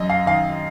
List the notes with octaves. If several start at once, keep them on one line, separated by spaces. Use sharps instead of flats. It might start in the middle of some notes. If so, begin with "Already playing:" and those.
Already playing: F#2 D#5
F5
D#3 F5